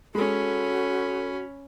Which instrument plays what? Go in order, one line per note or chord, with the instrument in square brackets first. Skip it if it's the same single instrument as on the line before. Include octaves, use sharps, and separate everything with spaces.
[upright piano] G#3 [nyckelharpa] C#4 B5 [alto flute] F#4 [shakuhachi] A4